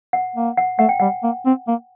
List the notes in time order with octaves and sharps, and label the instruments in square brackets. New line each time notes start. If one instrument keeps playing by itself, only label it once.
[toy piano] F#5
[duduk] A#3
[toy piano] F#5
[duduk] A3 [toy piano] F#5
[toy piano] G5
[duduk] G3 [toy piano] F#5
[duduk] A#3
C4
A#3